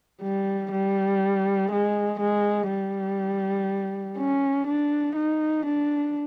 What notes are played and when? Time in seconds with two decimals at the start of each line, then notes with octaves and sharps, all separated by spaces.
0.22 G3
0.71 G3
1.71 G#3
2.19 G#3
2.69 G3
4.18 C#4
4.67 D4
5.16 D#4
5.66 D4